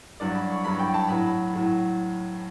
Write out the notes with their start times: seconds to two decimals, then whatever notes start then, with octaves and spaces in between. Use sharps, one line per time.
0.20 G2 F#3 D5
0.35 B5
0.50 C#6
0.64 G2 F#3 B5
0.79 G5
0.94 A5
1.08 A2 F#3 B5
1.54 A2 F#3